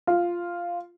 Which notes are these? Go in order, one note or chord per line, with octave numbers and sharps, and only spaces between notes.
F4